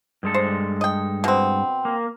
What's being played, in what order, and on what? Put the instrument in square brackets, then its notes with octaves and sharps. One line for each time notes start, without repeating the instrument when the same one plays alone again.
[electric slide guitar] G2 G#3 A4
[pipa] C5
D#5 G5
B2 C4
[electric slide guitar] A#3